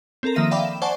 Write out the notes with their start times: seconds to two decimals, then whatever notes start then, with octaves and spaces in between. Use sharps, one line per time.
0.23 C4 A4 A#4
0.35 D#3 F3 A#3 E5 A#6 D#7
0.51 D5 E5 F5 G5 B5 D6
0.65 E7
0.82 C5 D5 F#5 G#5 A5 C#6